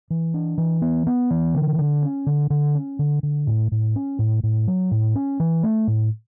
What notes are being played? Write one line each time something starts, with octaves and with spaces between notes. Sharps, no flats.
E3
D4
E3
B3
B3
E3
D3
D3
C#4
D3
D3
C#4
D3
D3
A2
A2
C#4
A2
A2
F#3
A2
C#4
E3
A3
A2